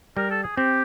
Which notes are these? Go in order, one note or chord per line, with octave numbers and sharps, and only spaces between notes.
G3 A#4
A4
G#4
C4 G4